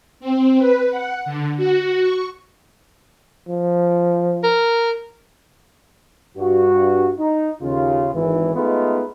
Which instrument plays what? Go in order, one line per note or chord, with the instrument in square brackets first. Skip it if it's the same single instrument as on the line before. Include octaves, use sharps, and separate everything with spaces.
[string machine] C4
B4
F#5
D3
F#4
C#6
[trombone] F3
[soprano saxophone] A#4
[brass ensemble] G2 F#4
D#4
D#2 C#3 F4
G#1 E3
G#3 A3 B3 D#4 F4 B4